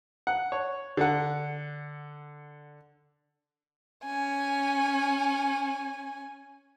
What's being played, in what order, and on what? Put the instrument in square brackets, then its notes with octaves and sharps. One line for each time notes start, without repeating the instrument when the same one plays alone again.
[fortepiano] F#5
C#5
D3 F#5
[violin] C#4 G#5